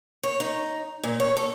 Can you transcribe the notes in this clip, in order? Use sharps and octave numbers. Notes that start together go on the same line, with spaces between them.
C#5
D#4
A#2
C#5
A4